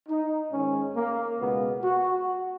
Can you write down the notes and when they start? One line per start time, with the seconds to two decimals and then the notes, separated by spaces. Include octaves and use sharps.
0.08 D#4
0.52 G#2 D#3 G#3 C#4
0.96 A#3
1.40 C#2 B2 G#3 B3
1.84 F#4